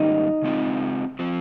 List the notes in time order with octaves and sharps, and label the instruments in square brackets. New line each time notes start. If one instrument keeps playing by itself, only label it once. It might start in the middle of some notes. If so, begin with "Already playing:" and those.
Already playing: [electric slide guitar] G#2 D#3 G3 A#3 C#4 [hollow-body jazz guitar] D#4
[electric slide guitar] C#3 G#3 C4 F4
F3 C4